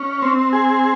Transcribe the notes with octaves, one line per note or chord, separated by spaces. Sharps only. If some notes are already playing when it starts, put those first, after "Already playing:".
Already playing: C#4
C4
G#4